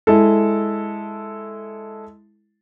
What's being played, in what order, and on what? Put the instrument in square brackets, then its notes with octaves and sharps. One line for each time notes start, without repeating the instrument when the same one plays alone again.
[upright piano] G#3 E4 A4